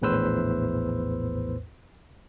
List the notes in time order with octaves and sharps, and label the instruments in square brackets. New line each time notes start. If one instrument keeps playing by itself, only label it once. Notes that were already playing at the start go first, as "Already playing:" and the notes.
[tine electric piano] A#1 E2 A2 B4 C5 E6